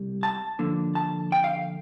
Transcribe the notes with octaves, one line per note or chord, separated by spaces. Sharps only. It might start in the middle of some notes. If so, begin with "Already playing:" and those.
Already playing: C2 G3
A5
D3 F3 A#3
A5
G5
F5